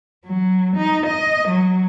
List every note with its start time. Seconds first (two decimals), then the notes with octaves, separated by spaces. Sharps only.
0.25 F#3
0.76 D#4
1.06 D#5
1.48 F#3